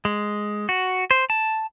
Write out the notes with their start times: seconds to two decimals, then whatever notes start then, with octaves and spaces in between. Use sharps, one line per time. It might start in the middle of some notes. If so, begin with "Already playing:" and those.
0.05 G#3
0.69 F#4
1.11 C5
1.30 A5